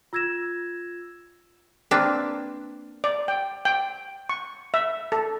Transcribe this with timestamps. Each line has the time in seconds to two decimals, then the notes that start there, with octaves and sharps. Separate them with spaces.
0.13 F4 E6 G#6 A#6 E7
1.91 A#3 C4 D4 B4
3.04 D5
3.28 G5
3.65 G5
4.29 C#6
4.74 E5
5.12 A4